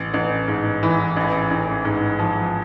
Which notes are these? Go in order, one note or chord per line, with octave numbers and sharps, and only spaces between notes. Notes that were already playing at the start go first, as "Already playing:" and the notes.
Already playing: A1
A1
G#2
E3
A1
A1
G#2
F3